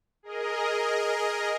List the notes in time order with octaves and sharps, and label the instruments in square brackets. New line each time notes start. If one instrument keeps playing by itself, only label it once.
[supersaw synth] G#4 A#4 D#5